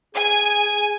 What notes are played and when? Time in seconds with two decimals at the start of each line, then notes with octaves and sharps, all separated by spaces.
0.15 G#4 G#5